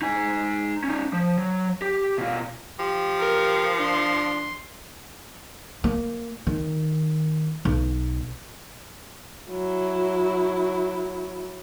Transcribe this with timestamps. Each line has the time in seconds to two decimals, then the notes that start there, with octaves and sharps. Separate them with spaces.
0.02 D#4 G#5
0.84 C#4 D#4
1.13 F3
1.38 F#3
1.82 G4
2.18 B2 F4
2.79 F3 G4
3.19 A#4
3.79 D4 C6
5.84 A#3
6.47 D#3
7.65 B1
9.51 F#3 E4